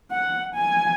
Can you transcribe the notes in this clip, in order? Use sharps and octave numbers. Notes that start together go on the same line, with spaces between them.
F#5
G#5